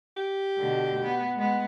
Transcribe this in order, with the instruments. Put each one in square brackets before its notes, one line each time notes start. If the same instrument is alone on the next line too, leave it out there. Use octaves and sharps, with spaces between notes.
[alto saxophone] G4
[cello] B2 D3
B3
G#3 B3